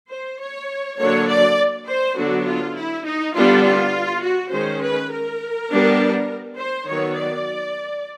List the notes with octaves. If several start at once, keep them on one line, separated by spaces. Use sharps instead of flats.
C5
C#5
D3 F#3 A#3 D4 C#5
D5
C5
D3 F#3 B3 D4 F#4
F4
E4
D#4
D3 G3 B3 D4 F4
F4
F#4
D#3 G#3 C#4 C5
B4
A#4
G3 B3 D4
C5
D#3 F#3 B3 C#5
D5